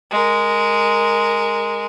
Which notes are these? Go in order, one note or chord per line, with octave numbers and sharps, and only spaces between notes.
G#3 A#4